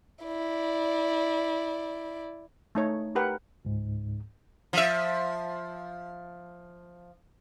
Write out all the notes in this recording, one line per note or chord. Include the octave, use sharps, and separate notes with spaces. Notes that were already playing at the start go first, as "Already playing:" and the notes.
E4 D5
A3 D#4 C#5
G4 A#4 B4 F#5 G5
C#2 G#2
F3 E5